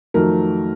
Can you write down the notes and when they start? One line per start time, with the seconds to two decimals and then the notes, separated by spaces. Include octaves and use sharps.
0.14 F2 D#3 F#3 A3 A#4